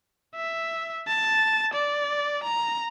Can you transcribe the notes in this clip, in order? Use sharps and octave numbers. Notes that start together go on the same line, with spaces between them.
E5
A5
D5
A#5